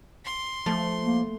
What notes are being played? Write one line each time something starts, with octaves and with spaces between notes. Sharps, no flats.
C6
F3 A3
A#3